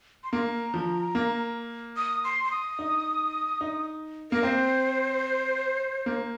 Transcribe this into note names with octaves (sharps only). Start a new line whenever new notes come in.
C6
A#3 A#5
F3
A#3
D#6
C6
C6
D#6
D#4
D#4
A#3 A#4
C4 C5
A#3